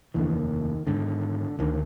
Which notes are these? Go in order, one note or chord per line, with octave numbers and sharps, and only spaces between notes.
F1 D#2 D3 E3
D#3
G#1 G#2 D3
D2 D3 D#3